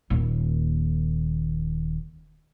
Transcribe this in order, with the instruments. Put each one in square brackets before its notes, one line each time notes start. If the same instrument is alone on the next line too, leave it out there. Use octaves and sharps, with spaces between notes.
[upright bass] D#1 D#2